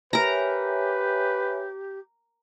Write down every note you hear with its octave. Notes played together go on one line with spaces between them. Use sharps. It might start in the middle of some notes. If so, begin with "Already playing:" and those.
G4 A#4 B4 C#5 E5 G#5 A#5